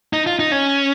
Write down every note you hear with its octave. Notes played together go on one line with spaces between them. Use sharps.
D#4
F4
D#4
C#4